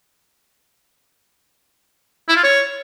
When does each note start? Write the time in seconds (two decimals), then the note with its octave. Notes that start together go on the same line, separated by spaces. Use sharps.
2.28 E4
2.36 F4
2.44 C#5